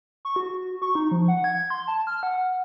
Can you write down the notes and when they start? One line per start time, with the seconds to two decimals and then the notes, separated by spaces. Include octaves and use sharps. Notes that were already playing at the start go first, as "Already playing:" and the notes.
0.25 C#6
0.36 F#4
0.82 C#6
0.95 D#4
1.11 F3
1.28 F#5
1.44 G#6
1.70 C6
1.88 A5
2.07 F6
2.23 F#5